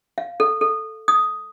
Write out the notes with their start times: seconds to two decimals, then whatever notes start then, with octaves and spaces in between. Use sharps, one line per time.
0.18 F5
0.40 A4
0.61 A4
1.08 D#6